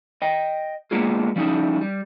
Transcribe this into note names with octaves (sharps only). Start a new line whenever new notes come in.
D#5 G5
G#3 A#3 B3 D4 F4 G#4
F3 G3 C#4 D#4 E4
G3